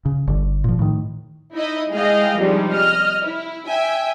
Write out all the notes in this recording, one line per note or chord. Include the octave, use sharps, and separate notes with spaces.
C#3
G1 D3
A#2 F3
A2 D#3
D#4 E4 D#5
G#3 E4 G#4 D#5 F5 G5
C3 F3 G3 G#3 D4 D#4
D#5 F6
E4
E5 G5 G#5